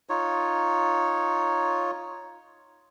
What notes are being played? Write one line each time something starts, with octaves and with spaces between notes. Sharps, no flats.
D#4 F4 C#5